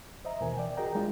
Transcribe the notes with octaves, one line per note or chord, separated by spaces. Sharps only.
C5 D#5 E5 A#5
D#2 B2 E3 A#4 G#5
D5 G5
F#4 G#4 A#4 D#5 G5 A#5
G3 G#3 D4 F4